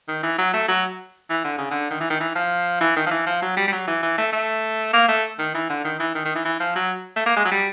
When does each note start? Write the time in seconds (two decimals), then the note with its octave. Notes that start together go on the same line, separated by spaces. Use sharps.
0.08 D#3
0.23 E3
0.38 F#3
0.53 A3
0.69 F#3
1.30 E3
1.45 D3
1.58 C#3
1.71 D3
1.91 D#3
2.01 E3
2.10 D#3
2.21 E3
2.35 F3
2.81 E3
2.96 D#3
3.07 F3
3.11 E3
3.27 F3
3.42 F#3
3.57 G3
3.68 G3
3.72 F#3
3.87 E3
4.03 E3
4.18 A3
4.33 A3
4.93 A#3
5.09 A3
5.39 D#3
5.55 E3
5.70 D3
5.85 D#3
6.00 E3
6.15 D#3
6.25 D#3
6.35 E3
6.45 E3
6.60 F3
6.76 F#3
7.16 A3
7.26 A#3
7.37 G#3
7.45 F#3
7.52 G3